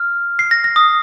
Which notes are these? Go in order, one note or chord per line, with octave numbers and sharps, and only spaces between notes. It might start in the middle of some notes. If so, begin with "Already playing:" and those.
Already playing: F6
C7
A#6
A#6
D#6